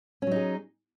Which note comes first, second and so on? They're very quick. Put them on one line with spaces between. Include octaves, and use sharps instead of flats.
C#4 F#3 D#4 G#4